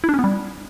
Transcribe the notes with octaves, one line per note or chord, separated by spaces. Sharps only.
E4
D4
C#4
B3
G3